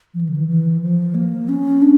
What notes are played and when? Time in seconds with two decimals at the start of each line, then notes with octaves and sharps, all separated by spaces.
0.14 F3
0.21 E3
0.29 D3
0.36 E3
0.48 E3
0.81 F3
1.15 A#3
1.49 C#4
1.82 D4